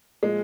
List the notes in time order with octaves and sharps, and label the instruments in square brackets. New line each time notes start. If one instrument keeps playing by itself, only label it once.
[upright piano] A#2 F3 G#3